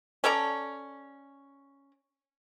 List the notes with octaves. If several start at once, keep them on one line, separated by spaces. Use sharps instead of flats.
C#4 A4 D5 A#5